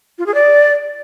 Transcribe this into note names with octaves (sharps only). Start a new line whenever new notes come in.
F4
G#4
D5